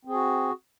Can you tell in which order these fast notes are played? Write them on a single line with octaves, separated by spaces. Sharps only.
C4 G#4 F#4